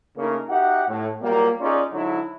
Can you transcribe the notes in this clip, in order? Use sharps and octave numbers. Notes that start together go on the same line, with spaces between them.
C#3 A3 A#3 D#4 A#4
D#4 F#4 G4 E5 F#5
A2
A#2 F#3 G3 A#3
C#4 D#4 F4 G#4 D5
G#2 D3 F#3 D#4 E4